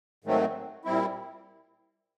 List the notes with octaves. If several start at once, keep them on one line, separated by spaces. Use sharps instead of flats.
G#2 D#3 F#3 A3 C4
A#2 G3 C4 E4